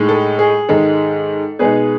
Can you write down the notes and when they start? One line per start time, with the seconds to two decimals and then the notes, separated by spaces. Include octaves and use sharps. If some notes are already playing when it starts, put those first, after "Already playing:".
Already playing: A2 G#3 D#4
0.09 A4
0.39 G#4
0.69 G#2 D#3 G#3 A4
1.59 B2 G#3 D#4 G#4 B4